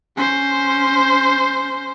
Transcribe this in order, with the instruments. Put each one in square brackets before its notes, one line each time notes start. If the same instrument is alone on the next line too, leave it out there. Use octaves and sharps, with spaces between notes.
[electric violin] C#4 C5